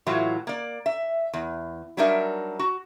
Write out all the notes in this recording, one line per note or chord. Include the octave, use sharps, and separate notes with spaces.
A2 E3 F#3 F4
A#3 D5
E5
E2
F#3 G3 D4 D#4 A#4 E5
F#4